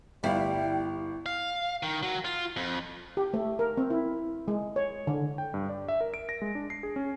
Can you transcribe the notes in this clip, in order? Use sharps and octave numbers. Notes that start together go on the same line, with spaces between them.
G1 G3 E4 F5 G5
F5
D#3
F#3
F4
F2
G4
A3
A#4
C4
E4
G#3
C#5
D3
G5
G2
D5
E5
A#4
D7
A#6
G#3
D4
C7
G#4
C#4